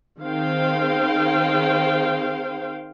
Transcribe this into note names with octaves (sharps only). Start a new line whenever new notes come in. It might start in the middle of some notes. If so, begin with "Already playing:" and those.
D#3 C4 G#4 C5 F5 G5